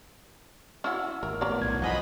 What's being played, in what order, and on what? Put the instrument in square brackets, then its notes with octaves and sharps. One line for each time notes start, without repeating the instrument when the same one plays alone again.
[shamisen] C#4 E4 F#4
[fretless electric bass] G#1 A#2 [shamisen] A#4
[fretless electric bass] A2 B3 [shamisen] C#4 A#4 D5
[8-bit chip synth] B1 [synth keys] G#6
[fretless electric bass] E2 G2 C3 [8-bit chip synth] F3 D#5 B5 [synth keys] F#5 G#5